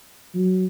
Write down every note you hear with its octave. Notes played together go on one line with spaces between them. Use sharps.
F#3